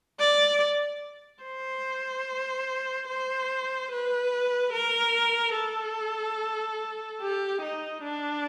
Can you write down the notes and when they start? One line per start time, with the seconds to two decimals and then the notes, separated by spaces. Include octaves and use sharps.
0.20 D5
1.43 C5
3.09 C5
3.91 B4
4.73 A#4
5.55 A4
7.21 G4
7.62 D#4
8.03 D4